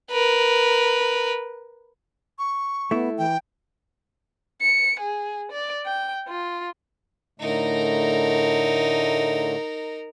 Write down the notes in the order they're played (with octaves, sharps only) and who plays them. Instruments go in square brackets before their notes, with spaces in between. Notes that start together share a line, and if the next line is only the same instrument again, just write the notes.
[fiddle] A#4 B4
[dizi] C#6
[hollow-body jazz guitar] A3 E4 [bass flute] B3
[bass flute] E3 [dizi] G5
[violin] C#7
G#4
D5
G5
F4
[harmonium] A2 D3 A3 [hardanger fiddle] D#4 A#4